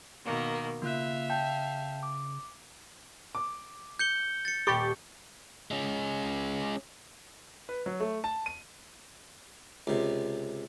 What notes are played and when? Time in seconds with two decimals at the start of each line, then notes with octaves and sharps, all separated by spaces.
0.24 B2 D#3 A#3
0.82 C#3 A#3 F4 E5 F5 F#6
1.30 G5 A5 G6
2.03 D6
3.35 D6
3.99 G6 C#7 G7
4.45 A6 C#7
4.67 D#1 G4 B5 C#6 A6
5.71 G#3 C#4
7.69 B4
7.86 F#3
8.00 A3
8.24 A5
8.46 D#7
9.87 C#2 C3